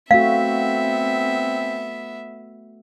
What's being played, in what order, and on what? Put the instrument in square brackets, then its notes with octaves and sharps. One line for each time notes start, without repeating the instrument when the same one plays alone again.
[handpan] A3 F#4 [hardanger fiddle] B3 E5 [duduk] C4 [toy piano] F5